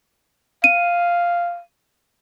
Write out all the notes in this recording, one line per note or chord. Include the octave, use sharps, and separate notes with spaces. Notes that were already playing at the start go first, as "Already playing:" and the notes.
F5 D#7